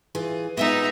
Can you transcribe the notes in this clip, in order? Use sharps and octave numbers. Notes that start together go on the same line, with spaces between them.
E3 F4 G#4
A#2 G#3 B3 D#4 E5